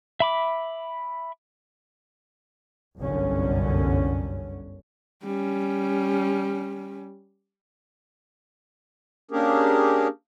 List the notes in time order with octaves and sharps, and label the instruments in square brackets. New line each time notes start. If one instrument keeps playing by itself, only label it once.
[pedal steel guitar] E5 B5 D6
[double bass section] G1 C2 F#2 D3 C#4
[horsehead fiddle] G3 C#4
[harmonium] A#3 C#4 D4 G4 G#4 A#4